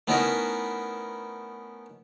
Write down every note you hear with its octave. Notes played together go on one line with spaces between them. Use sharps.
A3 B3 C#4 D#4 E4 A#4